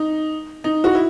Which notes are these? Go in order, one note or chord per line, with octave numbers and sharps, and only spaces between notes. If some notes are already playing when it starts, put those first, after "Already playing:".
Already playing: D#4
D#4
F#4
E4